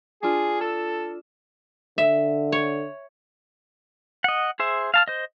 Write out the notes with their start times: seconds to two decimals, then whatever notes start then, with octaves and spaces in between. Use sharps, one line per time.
0.23 D4 F4 G#4
0.61 A4 E6
1.98 D3 E5
2.52 C#5
4.24 D#5 F#5
4.59 G#4 C5 E5
4.94 F5 A5 F6
5.08 C5 D#5